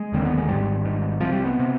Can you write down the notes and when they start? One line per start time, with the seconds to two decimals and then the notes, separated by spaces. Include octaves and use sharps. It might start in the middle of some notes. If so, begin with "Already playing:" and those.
Already playing: G#3
0.12 F1 D#2 D3 C4
0.25 B3
0.37 G#3
0.48 G#1 G#2 G3
0.85 G#1 G#2
1.21 C2 C3 F3
1.32 G3
1.45 B3
1.59 C3